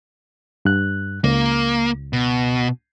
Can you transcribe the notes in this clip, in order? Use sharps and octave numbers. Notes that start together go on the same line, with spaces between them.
G2 F#6
C#2 A#3
B2